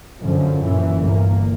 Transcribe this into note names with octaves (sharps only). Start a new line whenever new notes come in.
F#2 D3 F3
F#2 A#2 E3
G1 C2 A#3